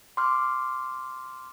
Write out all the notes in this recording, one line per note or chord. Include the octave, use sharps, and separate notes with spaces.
C6 D6 F6